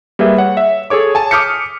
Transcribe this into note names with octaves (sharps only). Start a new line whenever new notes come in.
G3 A#3 G#4 B4 E5
C#5 F#5
E5
G#4 A4 C#5 D6
G#5 A5
D6 D#6 F6 G6 B6 C#7